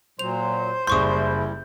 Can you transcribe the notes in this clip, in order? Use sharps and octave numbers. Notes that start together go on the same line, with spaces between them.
A#2 F#3 C5 F7
F#1 G3 E4 C6 C#6 D#6 G6